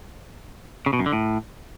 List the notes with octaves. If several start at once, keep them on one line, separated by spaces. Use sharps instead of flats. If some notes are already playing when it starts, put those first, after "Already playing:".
C#3
B2
F#2
D3
A2